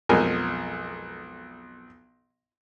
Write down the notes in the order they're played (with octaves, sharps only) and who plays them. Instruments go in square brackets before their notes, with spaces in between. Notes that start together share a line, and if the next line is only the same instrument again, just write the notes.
[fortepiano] B1 F2 G#3 A#4 G#5